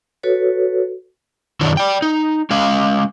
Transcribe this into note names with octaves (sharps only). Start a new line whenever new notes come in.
F#4 A4 B4 C#5
F#2 D#3 D4 E4 C#5
D5 G5
D#4
G#3 C#4 F5